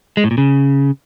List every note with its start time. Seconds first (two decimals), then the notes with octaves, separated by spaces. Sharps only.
0.17 G#3
0.24 A2
0.31 A#2
0.38 C#3